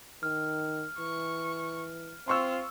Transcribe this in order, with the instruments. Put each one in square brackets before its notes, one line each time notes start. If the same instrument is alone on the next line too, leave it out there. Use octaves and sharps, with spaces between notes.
[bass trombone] D#3 [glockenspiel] F6
[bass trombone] E3 [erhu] C#6
[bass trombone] C4 [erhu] F4 [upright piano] C6 C#6 E6